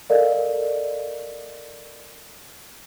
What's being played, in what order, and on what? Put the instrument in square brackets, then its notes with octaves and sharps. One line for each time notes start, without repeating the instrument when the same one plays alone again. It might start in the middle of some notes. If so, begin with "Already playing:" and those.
[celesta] A4 A#4 D5 D#5 F5